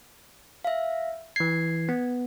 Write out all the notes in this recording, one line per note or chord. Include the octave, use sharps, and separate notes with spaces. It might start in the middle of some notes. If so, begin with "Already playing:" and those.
E5 F5
E3 G#6 C7
B3